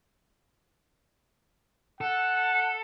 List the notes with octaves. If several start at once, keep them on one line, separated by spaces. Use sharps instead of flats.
A4 F#5